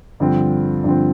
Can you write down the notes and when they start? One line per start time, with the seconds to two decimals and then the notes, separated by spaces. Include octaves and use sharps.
0.20 G2 D3 F3 C4
0.84 G2 D3 F3 C4